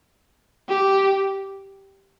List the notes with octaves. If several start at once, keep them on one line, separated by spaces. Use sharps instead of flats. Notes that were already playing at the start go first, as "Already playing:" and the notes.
G4